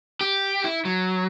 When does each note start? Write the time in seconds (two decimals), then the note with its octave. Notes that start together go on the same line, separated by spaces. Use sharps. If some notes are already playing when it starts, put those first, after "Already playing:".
0.21 G4
0.64 E4
0.85 F#3